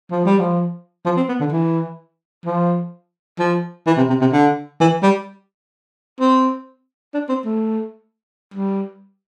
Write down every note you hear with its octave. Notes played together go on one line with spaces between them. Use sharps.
F3
G3
F3
F3
C4
B3
D3
E3
F3
F3
E3
C3
C3
C3
D3
E3
G3
C4
D4
C4
A3
G3